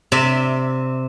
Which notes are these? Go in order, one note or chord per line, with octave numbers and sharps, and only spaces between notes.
C3 D5 E5